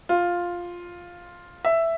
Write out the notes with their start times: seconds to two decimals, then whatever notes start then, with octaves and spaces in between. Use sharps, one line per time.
0.09 F4
1.65 E5